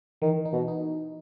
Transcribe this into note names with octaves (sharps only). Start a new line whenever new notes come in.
D#3 E3
D#4
B2
D#4